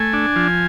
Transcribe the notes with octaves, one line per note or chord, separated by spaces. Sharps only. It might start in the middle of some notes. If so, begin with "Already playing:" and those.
Already playing: A3 G#5
D4
F3